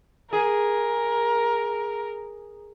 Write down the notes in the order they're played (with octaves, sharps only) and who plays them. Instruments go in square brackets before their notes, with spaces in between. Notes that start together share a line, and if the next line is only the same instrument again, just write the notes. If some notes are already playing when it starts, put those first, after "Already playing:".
[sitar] G#4 [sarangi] A#4